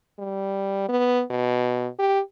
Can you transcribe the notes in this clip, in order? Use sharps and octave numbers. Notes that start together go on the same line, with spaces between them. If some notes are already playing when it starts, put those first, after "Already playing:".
G3
B3
B2
G4